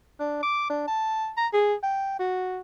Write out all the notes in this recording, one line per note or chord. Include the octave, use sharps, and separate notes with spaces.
D4
D6
D4
A5
A#5
G#4
G5
F#4